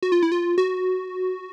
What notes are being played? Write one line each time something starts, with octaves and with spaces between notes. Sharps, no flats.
F#4
F4
E4
F4
F#4